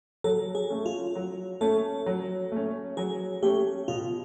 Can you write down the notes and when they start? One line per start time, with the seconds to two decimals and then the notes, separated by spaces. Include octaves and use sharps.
0.24 F#3 A4
0.55 G#4
0.70 A3 C#4
0.86 F4
1.15 F#3
1.61 A3 C#4 A4
2.06 F#3
2.52 A3 C#4
2.97 F#3 G#4
3.42 A3 C#4 G4
3.88 B2 F4